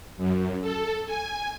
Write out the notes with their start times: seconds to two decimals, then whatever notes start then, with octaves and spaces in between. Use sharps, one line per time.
0.17 F#2
0.62 A4
1.06 G#5